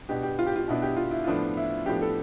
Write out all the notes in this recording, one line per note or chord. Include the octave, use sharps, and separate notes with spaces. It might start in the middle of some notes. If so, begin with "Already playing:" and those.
B2 B3 D4 G4
G4
F4
G4
F4
B2 B3 D4 E4
G4
F4
E4
A2 F3 B3 D4 F4
E4
A2 F3 B3 D4 G4
A4